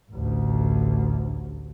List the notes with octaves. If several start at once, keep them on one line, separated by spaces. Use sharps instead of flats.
A1 D2